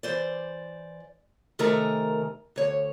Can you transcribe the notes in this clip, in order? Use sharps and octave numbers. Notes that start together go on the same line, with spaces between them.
E3 C5 D5
C3 D#3 A3 A#4 G#5 A#5
D2 C#5